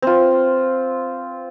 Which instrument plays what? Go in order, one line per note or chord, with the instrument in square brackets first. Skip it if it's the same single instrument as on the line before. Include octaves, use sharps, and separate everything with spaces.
[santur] C4 F4